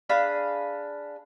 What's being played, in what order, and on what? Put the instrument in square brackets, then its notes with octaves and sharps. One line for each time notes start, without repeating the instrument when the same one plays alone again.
[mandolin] D4 G#4 F5 B5